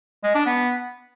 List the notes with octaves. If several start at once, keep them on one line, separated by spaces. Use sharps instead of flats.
G#3
D4
B3